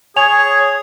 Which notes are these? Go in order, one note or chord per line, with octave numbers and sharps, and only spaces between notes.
G#4 C#5 G#5 F7